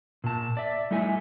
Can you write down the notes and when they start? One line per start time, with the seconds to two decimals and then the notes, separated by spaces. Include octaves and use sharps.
0.24 A#2 A5
0.57 D5 E5
0.91 G3 A3 E4 D#5 E5 G#5